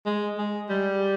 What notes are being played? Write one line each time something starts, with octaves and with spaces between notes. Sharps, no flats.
G#3
G#3
G3